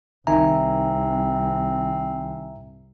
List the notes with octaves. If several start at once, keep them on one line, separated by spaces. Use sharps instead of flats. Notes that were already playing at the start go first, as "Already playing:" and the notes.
C2 D#3 C4 E5 G#5 A#5